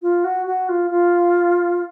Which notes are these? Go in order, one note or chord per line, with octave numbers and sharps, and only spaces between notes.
F4
F#4
F#4
F4
F4